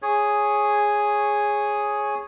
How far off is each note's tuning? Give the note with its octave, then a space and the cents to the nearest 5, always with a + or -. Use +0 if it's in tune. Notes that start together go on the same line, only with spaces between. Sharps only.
G#4 +0 C#5 +0